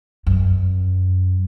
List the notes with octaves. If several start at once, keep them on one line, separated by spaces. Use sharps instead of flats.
F#2